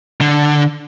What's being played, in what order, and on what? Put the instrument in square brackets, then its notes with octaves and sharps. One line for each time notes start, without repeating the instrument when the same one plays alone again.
[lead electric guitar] D3